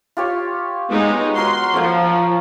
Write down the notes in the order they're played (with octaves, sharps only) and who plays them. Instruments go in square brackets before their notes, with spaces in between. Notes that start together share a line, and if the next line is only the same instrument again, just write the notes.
[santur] F4 G4 C#5
[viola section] G#3 B3 D#4
[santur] F#4 A#4 C#5 [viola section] C6
[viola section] F3 [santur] C#5 F5